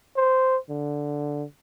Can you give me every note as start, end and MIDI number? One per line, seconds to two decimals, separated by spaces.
0.16 0.57 72
0.70 1.44 50